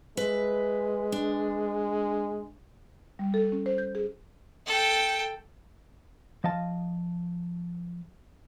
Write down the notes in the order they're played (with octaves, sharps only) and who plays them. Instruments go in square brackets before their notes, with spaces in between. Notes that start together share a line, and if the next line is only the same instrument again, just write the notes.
[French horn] G#3 [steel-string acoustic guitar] B4 E5
[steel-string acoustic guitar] D4
[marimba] G3
A4
C#4
C5
G6
G#4
[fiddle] A4 G5
[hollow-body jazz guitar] F3 D#5 F5 A5